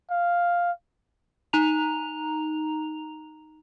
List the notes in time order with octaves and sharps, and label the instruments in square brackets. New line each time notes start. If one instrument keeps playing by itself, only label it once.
[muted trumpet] F5
[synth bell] D#4 A#5 F7